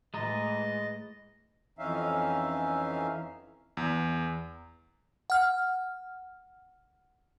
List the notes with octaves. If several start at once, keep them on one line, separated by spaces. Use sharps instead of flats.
A2 E3 G#3 D#5 A#5 D#6 A6
F2 E3 C#4 D#4 E5 F5
E2
F#5 F6